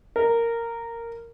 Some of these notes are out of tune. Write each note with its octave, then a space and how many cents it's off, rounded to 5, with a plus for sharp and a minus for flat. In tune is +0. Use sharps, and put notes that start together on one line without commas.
A#4 -10